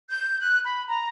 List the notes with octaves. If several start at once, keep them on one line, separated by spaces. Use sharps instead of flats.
G6
F#6
B5
A#5